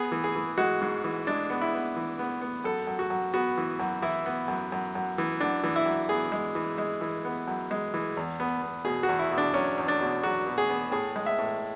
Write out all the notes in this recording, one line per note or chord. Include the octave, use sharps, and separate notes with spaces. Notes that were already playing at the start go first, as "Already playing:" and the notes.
Already playing: B3 G#4
E3
G#4
E3
G#3 F#4
G#2
E3
G#3 D4
B3
E4
B3
E3
B3
B3
F#2 A4
F#2
F#4
F#2
B3 F#4
E3
F#2
E3 E4
B3
F#2
F#2
F#2
E3
F#2 D4
E3
E4
F#2
B3 G#4
G#3
E3
G#3
E3
B3
F#2
G#3
E3
E2
B3
B3
B2 G#4
F#4
E2
E4
B2
D4
F#3 C#4
E2
D4
B2
F#3 F#4
B2
G#4
B3
A2 G#4
G#3
E5
A2